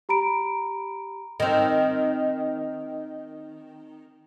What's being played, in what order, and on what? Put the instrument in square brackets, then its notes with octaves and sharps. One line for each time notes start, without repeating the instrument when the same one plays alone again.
[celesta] G4 A#5 B5 D7
[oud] D#3 C4